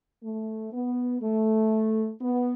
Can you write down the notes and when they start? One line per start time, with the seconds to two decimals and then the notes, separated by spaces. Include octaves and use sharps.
0.24 A3
0.73 B3
1.22 A3
2.21 B3